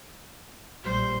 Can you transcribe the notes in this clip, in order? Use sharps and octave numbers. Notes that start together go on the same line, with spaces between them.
A#1 G3 C5